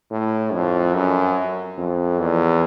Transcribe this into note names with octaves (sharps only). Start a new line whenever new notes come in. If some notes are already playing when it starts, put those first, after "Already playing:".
A2
F2
F#2
F2
E2